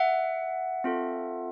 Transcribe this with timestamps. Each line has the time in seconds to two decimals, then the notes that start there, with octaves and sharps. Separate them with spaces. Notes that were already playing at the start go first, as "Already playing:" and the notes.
Already playing: E5 F#5
0.84 C4 F4 A4